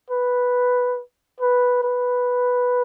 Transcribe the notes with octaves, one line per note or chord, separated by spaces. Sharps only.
B4
B4
B4